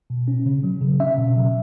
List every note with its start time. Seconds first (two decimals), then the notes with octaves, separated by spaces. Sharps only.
0.10 B2
0.28 C#4
0.46 C#3
0.64 F#3
0.81 C#3
1.00 C#4 E5
1.18 B2
1.36 F#3